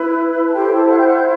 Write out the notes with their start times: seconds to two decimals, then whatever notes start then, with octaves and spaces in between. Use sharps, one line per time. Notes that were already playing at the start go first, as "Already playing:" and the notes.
Already playing: E4 B4
0.46 A5
0.54 E4 G4 A4 C5 G5
0.71 A4 A5
0.89 F#5 F#6
0.97 G5 G6
1.06 F#5 F#6
1.14 G6